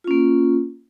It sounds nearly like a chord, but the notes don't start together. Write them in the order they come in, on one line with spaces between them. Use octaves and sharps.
F4 C#4 A#3